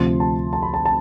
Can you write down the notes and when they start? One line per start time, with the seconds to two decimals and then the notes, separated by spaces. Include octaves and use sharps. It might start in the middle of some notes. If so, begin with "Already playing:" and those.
Already playing: D2 C3 F3 C6
0.20 A5
0.53 A5
0.63 B5
0.74 A5
0.85 A5